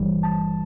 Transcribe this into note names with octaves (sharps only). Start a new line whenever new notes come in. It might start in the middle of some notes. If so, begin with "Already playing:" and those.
Already playing: G1 G2 E3 G3
A5